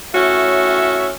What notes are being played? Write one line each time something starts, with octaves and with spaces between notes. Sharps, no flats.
A2 C#4 F#4 E5